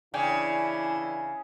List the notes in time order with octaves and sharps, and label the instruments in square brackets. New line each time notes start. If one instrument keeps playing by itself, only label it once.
[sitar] C#3 [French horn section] E3 D4 E4 [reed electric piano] D5 G5 G#5